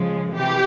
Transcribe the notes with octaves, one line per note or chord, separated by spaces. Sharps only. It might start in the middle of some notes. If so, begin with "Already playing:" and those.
Already playing: C#3 F3 G#3
C3 E3 G4